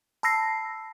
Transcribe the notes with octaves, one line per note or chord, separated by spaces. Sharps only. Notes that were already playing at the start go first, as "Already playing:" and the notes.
A5 B5 E6 A#6 C7